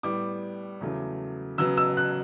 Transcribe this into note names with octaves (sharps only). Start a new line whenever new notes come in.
A2 G3 B3 D6
E2 C#3 F#3 A3
C#3 F#3 B3 E6
E6
F#6